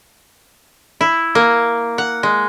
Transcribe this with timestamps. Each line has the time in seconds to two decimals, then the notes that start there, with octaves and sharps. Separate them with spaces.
1.01 E4
1.35 A#3
1.98 F#5
2.23 G#3